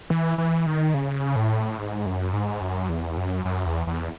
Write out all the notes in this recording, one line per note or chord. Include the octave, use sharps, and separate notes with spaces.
E3
E3
D#3
C#3
A2
G#2
F#2
G#2
F#2
E2
F#2
F#2
E2
E2